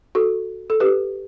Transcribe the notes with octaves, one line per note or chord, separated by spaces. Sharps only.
F#4 A4
A4
G4 B4